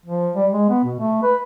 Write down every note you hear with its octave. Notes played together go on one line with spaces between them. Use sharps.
F3
G3
G#3
B3
B2
A3
B4